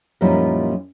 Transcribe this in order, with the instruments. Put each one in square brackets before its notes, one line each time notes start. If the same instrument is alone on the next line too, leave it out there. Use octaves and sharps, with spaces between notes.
[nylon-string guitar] F#2 A#2 F3 G3 D#4 E4